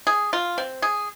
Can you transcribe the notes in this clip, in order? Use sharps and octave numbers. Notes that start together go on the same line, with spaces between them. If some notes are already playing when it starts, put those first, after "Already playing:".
G#4
F4
C4
G#4